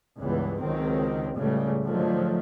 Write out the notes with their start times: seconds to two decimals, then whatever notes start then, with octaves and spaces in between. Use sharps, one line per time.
0.18 C#2 G2 E3 B3
0.60 C#2 D#3 F#3 C4
1.37 C#2 A2 C#3 G3 A3
1.85 G#2 D3 D#3 F3 F#3 A3